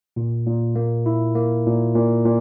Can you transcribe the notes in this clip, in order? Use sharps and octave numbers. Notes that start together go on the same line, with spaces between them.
A#2
A#2
A#3
E4
A#3
A#2
A#2
A#2